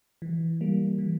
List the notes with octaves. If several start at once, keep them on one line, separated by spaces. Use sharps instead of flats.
E3
G3 A#3
E3